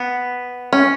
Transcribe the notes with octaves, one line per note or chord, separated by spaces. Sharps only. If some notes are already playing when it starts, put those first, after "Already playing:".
Already playing: B3
C#4